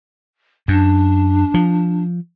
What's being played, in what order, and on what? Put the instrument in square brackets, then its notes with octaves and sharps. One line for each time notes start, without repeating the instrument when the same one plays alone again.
[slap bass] F#2 [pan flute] D4
[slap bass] F3